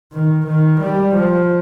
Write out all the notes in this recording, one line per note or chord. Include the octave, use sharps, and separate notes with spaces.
D#3
D#3
G3
F3